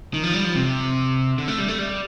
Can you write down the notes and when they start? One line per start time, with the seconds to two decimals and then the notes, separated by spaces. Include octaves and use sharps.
0.14 D#3
0.23 F3
0.33 G3
0.44 F3
0.55 C3
1.38 D3
1.48 A3
1.58 G3
1.68 A3
1.79 G3